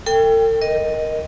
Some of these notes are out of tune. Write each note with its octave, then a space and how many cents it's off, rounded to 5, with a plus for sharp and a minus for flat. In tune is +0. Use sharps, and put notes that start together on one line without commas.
A4 +40 G5 +10
A#4 +10 D#5 +0